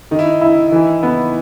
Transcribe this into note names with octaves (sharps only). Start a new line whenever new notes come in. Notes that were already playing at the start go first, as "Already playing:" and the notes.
D#3 D#4
E4
D#4
E4
E3
B3